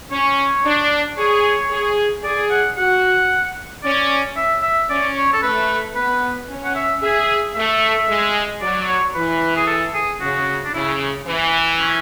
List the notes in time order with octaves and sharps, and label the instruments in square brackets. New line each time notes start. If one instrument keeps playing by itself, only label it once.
[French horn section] C#4 [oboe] C#5
[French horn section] D4
[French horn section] G#4 [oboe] C#5
[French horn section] G#4
[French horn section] G#4 [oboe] D5
[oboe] F#5
[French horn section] F#4 [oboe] F#5
[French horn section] C#4 [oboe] D5
[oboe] E5
E5
[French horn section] C#4 [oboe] D5
[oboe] C#5
A4
[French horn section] A3 [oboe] B4
[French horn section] B3 [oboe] B4
[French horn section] C#4
[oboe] F#5
E5
[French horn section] G#4 [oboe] E5
[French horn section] A3 [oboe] E5
[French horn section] G#3
[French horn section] F#3 [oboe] D5
[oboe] D5
C#5
[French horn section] E3 [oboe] B4
[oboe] G#4
A4
G#4
[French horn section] C#3 [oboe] F#4
[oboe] D4
[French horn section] C#3 [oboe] E4
[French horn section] E3
[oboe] C#4